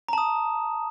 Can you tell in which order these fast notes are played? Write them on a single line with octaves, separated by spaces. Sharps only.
A#5 A5 D#6